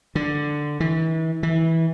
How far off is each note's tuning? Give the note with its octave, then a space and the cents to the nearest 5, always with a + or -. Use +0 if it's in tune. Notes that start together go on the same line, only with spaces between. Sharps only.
D3 +5
E3 -35
E3 -15